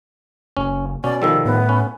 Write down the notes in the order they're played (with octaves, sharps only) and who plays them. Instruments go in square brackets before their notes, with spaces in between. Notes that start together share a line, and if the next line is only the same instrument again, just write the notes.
[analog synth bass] F#1 [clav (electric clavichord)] C#4
[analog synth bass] B2 [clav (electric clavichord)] C#4 [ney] D5
[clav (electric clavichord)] D#3 F3 G3 [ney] A4
[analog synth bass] A2 [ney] B3
[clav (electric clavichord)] C#4